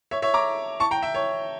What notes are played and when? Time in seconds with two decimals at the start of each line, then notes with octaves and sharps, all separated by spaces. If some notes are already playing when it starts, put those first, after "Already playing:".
0.11 C#5 E5
0.22 C#5 E5
0.34 A#5 D6
0.80 A5 C#6
0.91 G5 A#5
1.02 E5 G5
1.14 C#5